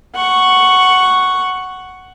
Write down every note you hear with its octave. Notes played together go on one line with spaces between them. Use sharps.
F#5 C#6